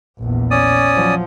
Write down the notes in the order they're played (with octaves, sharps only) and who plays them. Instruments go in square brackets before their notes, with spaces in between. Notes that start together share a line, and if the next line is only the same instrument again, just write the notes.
[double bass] A#1 E2
[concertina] C#4 D5 D#6
[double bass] F3 F#3